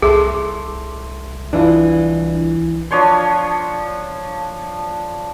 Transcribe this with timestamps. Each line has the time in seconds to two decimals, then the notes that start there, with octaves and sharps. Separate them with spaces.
0.02 C2 G#4 A4 E5 C6
1.53 E3 D4 E4 F4
2.91 F3 D4 C#5 C6